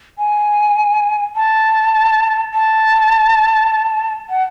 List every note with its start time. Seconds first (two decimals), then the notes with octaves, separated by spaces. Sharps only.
0.18 G#5
1.35 A5
2.53 A5
4.29 F#5